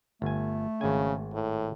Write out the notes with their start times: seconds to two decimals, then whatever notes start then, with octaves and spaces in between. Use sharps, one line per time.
0.22 G1 A3 G#5
0.81 G#1 C#3 G#5
1.33 A2